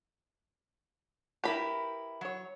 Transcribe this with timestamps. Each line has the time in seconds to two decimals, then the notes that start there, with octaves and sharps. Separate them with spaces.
1.44 E4 G4 A#4 B4 B5
2.21 F#3 C#5